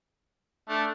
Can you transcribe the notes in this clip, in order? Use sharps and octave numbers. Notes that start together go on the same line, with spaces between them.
A3 D4